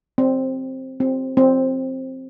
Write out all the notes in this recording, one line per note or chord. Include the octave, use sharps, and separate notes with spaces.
C4
C4
C4